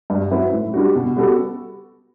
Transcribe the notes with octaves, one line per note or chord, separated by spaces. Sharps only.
G2
F#3 C4 E4 B4
A2
G3 D4 F#4
B2
G3 B3 F#4 A4